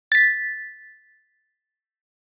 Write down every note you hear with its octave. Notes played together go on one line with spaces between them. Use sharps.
A6 B6